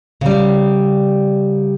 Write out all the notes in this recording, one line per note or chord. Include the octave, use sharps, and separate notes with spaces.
C#3 G3